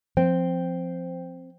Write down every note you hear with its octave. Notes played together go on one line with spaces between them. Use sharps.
F3 C4 C5 G5